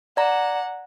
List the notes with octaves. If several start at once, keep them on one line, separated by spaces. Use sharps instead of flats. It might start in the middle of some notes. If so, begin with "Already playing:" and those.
D5 F#5 A#5